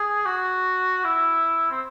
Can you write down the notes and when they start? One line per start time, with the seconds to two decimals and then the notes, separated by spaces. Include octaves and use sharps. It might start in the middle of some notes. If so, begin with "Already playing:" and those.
Already playing: G#4
0.26 F#4
1.04 E4
1.71 C4